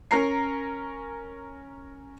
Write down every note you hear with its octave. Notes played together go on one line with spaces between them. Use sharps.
C#4 A#4 A#5 C7